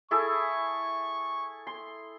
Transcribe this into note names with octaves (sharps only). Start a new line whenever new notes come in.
E4 G#4 A4 C#6
C6